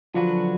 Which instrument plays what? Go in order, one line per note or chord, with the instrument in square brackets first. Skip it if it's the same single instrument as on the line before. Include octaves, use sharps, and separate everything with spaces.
[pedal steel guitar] D3 F#3 D4 F#4 B4 [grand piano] F3 F4